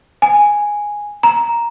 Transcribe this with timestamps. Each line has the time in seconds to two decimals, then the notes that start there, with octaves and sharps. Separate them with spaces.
0.22 G#5
1.23 A#5